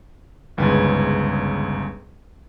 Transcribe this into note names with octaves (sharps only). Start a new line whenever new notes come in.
G1 C#2 G#2 B4 G#5